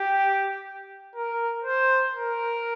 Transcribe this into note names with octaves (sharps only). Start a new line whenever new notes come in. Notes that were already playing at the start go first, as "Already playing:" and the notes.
Already playing: G4
A#4
C5
A#4